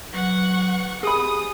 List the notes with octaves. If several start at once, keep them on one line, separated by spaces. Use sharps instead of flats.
F#3 B4 F#5 C#6
G4 G#4 G#5 B5 D#6